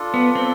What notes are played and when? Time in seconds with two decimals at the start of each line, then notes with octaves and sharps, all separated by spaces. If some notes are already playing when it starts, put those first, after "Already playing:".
Already playing: D4 F4 A4
0.14 B3
0.35 C4